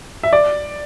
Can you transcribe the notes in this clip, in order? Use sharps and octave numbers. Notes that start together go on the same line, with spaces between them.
E5
D5